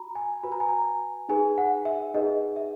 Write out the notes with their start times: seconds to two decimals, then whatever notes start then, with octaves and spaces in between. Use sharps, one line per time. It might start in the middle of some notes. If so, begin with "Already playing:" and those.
Already playing: F#4 A#5 B5
0.15 G#5
0.43 F#4 B4 B5
0.52 A#5
0.60 G#5
0.69 A#5
1.29 D#4 G#4 B4 G#5
1.58 F#5
1.85 E5
2.14 D#4 G#4 B4 D#5
2.56 E5